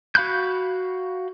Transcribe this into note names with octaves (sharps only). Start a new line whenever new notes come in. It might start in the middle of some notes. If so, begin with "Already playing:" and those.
F#4 F5 B5 F#6 G6